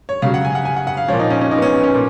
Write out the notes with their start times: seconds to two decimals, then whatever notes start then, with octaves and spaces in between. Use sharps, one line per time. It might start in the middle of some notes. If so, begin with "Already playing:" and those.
0.09 C#5
0.22 C#3 F#3 F5
0.34 F#5
0.45 G#5
0.55 F#5
0.65 G#5
0.76 F#5
0.87 F#5
0.97 F5
1.08 A#2 F3 C#5
1.19 D#4
1.30 C#4
1.41 C#4
1.51 D#4
1.58 B3
1.62 C#4
1.74 B3
1.83 C#4
1.94 A#2